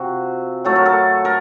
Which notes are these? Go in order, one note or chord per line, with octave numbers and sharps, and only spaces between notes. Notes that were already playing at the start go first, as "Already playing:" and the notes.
Already playing: C3 F3 C4 F#4
A2 F#3 A3 A4
A#4
A4
A#4